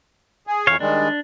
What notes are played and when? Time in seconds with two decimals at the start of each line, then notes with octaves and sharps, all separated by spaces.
0.47 G#4
0.67 F2 E3 C#5 F5
0.80 D#3 G3 G#3 D4